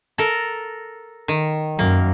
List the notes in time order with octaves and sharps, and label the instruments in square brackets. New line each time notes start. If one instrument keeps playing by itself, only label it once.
[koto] A4 A#4
D#3
[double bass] F#2 [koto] A#3